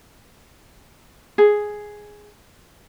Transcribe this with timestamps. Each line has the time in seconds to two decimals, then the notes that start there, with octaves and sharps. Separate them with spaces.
1.38 G#4